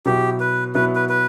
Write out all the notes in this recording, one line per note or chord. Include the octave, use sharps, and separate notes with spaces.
B2 F#3 B3 E4 G4
B4
B2 F#3 B3 E4 B4
B4
B4